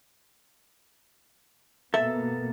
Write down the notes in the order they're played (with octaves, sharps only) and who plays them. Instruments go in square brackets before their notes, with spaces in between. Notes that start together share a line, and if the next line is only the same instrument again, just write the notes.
[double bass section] B2 A#3 B3 [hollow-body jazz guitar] A4 E5